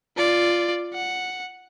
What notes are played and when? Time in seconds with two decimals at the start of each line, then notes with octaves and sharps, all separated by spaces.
0.17 F4 D5
0.93 F#5